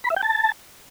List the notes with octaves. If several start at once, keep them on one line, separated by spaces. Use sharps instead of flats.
B5
E5
G5
A5